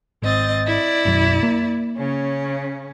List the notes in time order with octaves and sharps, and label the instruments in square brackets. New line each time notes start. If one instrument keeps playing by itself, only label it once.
[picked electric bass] G#1 [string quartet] C4 D#5 A6
[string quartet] E4 D5
[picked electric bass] F#1 B1 F#2
A#3
[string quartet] C#3 C#4